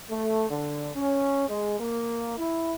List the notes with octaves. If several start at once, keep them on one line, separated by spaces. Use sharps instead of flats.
A3
D3
C#4
G#3
A#3
E4